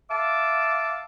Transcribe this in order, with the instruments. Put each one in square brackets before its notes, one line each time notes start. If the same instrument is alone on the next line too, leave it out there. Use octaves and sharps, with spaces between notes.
[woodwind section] E5 F5 A5 D6